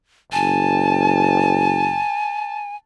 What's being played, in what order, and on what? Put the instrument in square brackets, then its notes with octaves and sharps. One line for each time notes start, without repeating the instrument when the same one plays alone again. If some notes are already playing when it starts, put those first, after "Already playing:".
[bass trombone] F#1 [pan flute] G#5 [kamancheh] A5